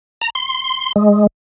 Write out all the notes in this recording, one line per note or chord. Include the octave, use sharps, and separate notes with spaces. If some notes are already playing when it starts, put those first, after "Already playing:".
A#5
C6
G#3